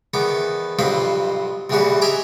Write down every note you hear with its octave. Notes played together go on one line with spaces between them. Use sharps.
E2 D#3 B3 D6
B1 G2 F3 C4 D#5 B5
B1 E2 A2 E3 G3 F#4
D#5 E5 G5 G#5 A#5 D6